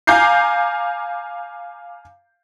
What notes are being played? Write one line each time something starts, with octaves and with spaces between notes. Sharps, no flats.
F5 G#5 A#5 D6 G6 C7